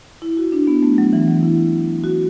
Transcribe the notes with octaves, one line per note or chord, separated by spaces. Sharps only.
E4
F#4
D4
B3
A3
F#3
E3
F#3
E4
F#4